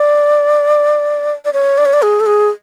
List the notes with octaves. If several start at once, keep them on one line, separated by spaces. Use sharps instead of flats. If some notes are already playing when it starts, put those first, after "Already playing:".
Already playing: D5
D5
C#5
D5
C#5
D5
G#4
A4
G#4